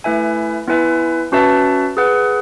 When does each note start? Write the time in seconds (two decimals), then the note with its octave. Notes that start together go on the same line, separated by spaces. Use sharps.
0.04 A3 E4 B4 E5 G#5
0.68 B3 E4 B4 E5 G#5
1.32 C#4 F#4 B4 E5 A5
1.97 G#4 B4 F#5